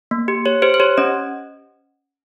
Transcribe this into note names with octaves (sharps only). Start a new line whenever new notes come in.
A#3
G4
G4 C#5
G4 C5
C5
G4 C#5
C#4 D#5